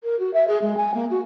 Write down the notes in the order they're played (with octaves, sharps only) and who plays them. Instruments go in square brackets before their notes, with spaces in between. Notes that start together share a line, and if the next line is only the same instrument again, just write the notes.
[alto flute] A#4
F#4
E5
G#4
G#3
G#5
A#3
F#4